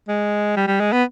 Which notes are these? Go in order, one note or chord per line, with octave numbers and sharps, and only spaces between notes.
G#3
G3
G3
G#3
B3